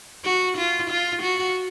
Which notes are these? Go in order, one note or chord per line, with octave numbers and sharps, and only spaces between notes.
F#4
F4
F4
F#4